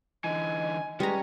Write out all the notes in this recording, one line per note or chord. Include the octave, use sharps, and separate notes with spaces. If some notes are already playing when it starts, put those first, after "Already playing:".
D3 E3 D#5 G#5
G3 G#3 C#4 B4 A#5